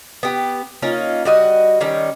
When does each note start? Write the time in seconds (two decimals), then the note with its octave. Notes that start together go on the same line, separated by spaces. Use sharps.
0.23 B3 G4
0.82 A#3 C#4 D#4 F4
1.25 G3 F#4 D#5
1.81 D#3 G3 C#4